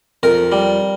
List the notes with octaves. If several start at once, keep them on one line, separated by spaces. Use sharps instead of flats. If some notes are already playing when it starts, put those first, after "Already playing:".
F2 A#4
G3